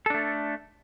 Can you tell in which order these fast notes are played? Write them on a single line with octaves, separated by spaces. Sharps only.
A4 D4 A3